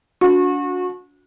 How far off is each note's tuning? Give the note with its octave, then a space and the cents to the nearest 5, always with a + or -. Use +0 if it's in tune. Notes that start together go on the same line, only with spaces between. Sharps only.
D4 -35 F#4 -30